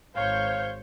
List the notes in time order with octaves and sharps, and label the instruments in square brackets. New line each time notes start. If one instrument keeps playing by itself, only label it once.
[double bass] G#1 [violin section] C5 C#5 G6 [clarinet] F5